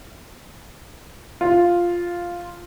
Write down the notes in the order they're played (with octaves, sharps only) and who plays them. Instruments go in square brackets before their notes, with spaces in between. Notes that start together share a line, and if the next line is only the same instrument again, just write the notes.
[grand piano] F4